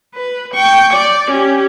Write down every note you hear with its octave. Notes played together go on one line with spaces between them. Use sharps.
B4
G5 C#6
D5
C#4 G4